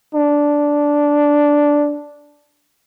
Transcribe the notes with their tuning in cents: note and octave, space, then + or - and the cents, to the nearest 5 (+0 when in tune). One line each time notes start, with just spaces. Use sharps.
D4 -5